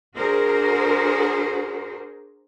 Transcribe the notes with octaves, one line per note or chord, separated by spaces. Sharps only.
D4 F#4 G#4 A#4 C5